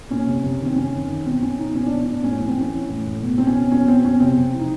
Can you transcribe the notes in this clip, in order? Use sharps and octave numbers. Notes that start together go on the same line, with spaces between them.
A#2 C#4
C3
C3
D#3
C4
C3 C#4
D#3
D#3
B2 C4
B2 C#4
B2 D#4
B2 C#4
B2 D4
E4
B2 D4
A2 C#4
E3 C#4
C4
E3 C#4
E3
A2
A2
B2
B2 C4
C#4
B2
B2 C#4
B2 C4
B2 C#4
C3 C4
C3
E3
D#4